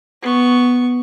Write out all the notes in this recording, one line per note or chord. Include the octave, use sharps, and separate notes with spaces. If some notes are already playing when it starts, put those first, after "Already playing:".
B3 C#6